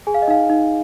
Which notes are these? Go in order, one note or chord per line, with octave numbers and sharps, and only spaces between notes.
G#4 G#5
F5
D#5
D#4 F5
D#4